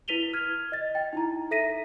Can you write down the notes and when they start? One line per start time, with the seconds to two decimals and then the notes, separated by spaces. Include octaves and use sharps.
0.08 E4 B4 B6 D#7 F7 G7
0.33 F6 G#6
0.72 D#5 A6
0.95 G5
1.13 D#4 E4 A#5
1.51 A4 E5 A#6 B6 D#7